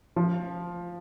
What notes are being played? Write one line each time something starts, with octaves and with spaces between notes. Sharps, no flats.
F3